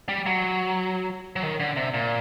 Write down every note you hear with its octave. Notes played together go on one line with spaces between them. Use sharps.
G3
F#3
F#3
D#3
D3
C3
A#2